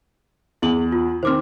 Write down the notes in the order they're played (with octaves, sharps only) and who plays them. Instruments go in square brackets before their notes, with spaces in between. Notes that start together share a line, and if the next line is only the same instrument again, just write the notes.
[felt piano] E2 [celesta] E4 G#4 F#7
[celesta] F4
[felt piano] D#3 C4 [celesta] C5 D6 F6